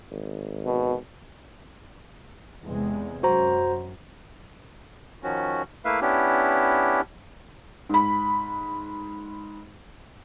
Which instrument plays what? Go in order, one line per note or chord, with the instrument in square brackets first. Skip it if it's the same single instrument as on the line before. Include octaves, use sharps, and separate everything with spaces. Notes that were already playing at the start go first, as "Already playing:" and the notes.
[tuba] G#1
[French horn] B2
[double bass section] E2 C3 G#3
[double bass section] F#2 [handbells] F#4 C5 A#5
[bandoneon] D#3 F3 C#4 F#4
A3 A#3 E4 B4 E5 F5
B3 C#4 D4 E4 G4
[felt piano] G#2 B5